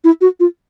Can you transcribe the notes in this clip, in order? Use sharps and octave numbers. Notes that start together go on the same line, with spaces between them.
E4
F#4
F4